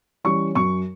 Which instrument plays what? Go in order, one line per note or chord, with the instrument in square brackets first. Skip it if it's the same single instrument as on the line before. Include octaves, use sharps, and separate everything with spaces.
[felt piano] E3 G3 C#4 C#6
F#2 C#6